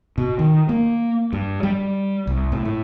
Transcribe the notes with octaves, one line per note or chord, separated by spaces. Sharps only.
B2
D#3
A#3
G2
G3
C2
A2
A2